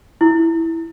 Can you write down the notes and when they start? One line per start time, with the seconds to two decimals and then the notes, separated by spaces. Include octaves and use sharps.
0.21 E4